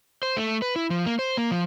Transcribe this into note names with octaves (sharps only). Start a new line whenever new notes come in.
C5
A3
B4
E4
F3
A#3
C5
A#3
F3